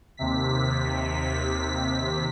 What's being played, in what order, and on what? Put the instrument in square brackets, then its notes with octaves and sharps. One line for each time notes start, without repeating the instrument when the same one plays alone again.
[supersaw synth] D#2 C3 B6